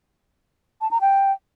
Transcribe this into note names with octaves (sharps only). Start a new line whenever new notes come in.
A5
A#5
G5